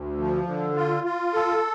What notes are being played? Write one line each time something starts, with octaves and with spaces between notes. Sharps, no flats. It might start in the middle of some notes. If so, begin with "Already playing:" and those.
Already playing: D2
F3
D3
F4
F4
A4